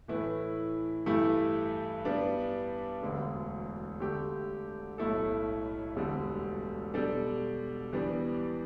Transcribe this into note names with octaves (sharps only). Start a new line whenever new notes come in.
A2 E3 A3 E4 B4
G2 E3 A3 E4 G4
G2 G3 B3 D4
E1 D2 D3
D3 A3 G4
B1 A2 A3 E4 A4
E1 D2 D3 G3
B2 G3 D4 A4
E2 E3 G3 B3 D4